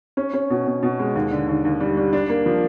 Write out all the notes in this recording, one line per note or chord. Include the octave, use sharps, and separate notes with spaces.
C#4
C#4
B2
B2
B2
G#3
D#2
D3
D#2
D#2
G3
G3
D4
A#3
F3